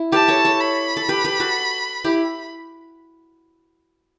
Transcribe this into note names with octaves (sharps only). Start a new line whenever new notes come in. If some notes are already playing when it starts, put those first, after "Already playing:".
Already playing: E4
G4 B4 A5
A4 C#5
A4 C#5
B5
A4
G4 B4
G4 B4
F#4 A4
E4 G4